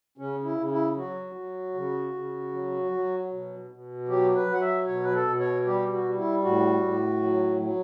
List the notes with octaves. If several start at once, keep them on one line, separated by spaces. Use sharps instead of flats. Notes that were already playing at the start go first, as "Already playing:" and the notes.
C#3 C#4
E4
C#3
E4
F#3 F#4
F#3
C#3
C#3
F#3
F#3
B2
B2
F#3 G4
B4
F#3
F#5
E5
B2 C#5
B4
A4
B2
C#5
G3 G4
F#4
G3
E4
A2 F#4
A2
F#3
F#3